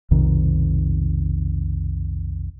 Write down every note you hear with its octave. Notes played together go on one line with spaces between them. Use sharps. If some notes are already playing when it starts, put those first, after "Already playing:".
B1 F2 C3 D#3